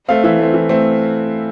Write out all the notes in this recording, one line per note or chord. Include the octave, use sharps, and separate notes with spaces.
A3 C4 F5
E3 E5
A3 C4
E3
A3 C4